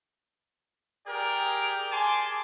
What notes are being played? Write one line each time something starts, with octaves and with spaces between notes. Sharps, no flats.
G4 G#4 A#4 D5 G5
G4 G#4 G#5 A5 C6 D6